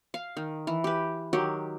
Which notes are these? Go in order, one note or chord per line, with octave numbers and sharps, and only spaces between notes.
F5
D#3
E3
G4 B4
D#3 F#3 G4